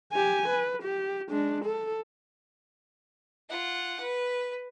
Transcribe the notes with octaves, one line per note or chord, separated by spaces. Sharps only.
G4 G#5
B4
G4
G#3 D4
A4
F4 F#5
B4